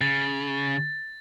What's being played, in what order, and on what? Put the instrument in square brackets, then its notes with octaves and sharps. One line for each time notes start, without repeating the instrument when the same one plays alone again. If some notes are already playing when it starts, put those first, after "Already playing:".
[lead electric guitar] C#3 [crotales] A6